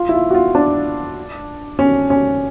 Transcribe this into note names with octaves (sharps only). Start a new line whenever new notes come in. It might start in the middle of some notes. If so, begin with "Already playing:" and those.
Already playing: F4
E4
F4
F#4
F4
D4
C#4
C#4